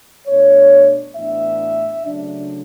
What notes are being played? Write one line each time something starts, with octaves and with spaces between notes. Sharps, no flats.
B2 A3 D4 C#5
A2 E3 B3 D4 E5
C#3 F#3 A3 D4